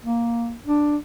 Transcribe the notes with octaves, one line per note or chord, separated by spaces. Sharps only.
A#3
D4